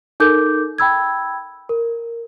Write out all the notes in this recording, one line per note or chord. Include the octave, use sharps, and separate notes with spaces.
D#4 A4 A#4 D6 G6
G5 B5 E6 G#6
A#4